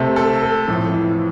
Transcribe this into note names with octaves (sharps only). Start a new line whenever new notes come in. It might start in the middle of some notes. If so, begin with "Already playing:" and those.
Already playing: C3 A3 A4
A4
A4
F2 A2
E3